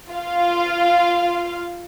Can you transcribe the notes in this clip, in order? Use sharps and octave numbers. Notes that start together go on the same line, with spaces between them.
F4 F5